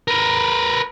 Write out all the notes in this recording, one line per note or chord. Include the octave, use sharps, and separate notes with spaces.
A#4 B4